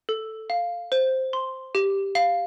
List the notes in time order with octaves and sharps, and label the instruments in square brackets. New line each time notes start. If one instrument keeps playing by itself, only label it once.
[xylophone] A4
F5
C5
C6
G4
F5